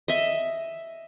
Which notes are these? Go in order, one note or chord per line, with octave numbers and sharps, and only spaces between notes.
D#5 E5